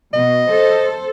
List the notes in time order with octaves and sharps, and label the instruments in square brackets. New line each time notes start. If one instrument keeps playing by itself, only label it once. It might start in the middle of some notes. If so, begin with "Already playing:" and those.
[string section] B2 [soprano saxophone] D#5
[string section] A4 C5